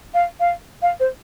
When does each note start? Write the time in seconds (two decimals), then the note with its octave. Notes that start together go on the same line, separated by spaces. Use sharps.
0.14 F5
0.40 F5
0.82 F5
1.00 C5